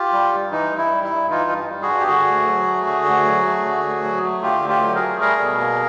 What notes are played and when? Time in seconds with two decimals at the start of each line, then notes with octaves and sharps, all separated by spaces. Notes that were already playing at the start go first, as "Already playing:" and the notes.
Already playing: F4 G4
0.12 G3
0.32 G2
0.51 E3 D#4
0.71 G2
0.77 E4
0.91 G3
1.03 E4
1.10 G2
1.30 E3 D#4 F4
1.50 G2
1.69 G3
1.82 F#4 G#4
1.89 G2
2.00 G4
2.08 D3 F#4 G#4
2.27 D2
2.47 F#3
2.66 A3
2.87 D3
3.05 D2
3.25 F#3
3.45 A3
3.65 D3
3.84 D2
4.04 F#3
4.24 A3
4.42 D3 F4 G4
4.62 D2
4.68 F4 G4
4.82 F#3
4.95 G#4 A#4
5.01 A3
5.21 G3 G#4 A#4
5.41 B2
5.60 A#3